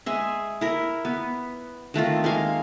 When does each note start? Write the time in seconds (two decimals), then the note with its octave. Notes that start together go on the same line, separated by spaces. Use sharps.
0.06 G#3 G#4 E5
0.61 E4 A#4
1.05 B3
1.94 D#3 A3 C4 F4
2.24 G#3 A#3 F5